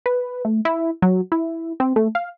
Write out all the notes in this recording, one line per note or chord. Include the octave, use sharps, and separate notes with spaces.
B4
A3
E4
F#3
E4
C4
A3
F5